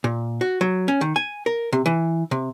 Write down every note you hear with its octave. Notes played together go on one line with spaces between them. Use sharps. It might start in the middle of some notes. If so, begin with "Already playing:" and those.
A#2
F#4
F#3
C#4
D#3
G#5
A#4
C3
E3
C3